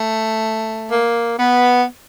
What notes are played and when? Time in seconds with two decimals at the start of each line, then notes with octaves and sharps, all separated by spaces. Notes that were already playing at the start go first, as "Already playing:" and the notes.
Already playing: A3
0.91 A#3
1.39 B3